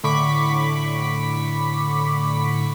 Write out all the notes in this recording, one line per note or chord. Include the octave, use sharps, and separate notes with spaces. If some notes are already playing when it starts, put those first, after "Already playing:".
A2 D3 B5 C#6 D6 B6